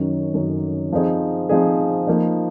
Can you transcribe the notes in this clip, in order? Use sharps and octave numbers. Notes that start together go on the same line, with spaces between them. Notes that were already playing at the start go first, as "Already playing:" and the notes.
Already playing: F#2 D#3 F#3 C#4
F#2 D#3 F#3 C#4
F3 C4 D#4 G#4
F3 C4 D#4 G#4
F3 A#3 D#4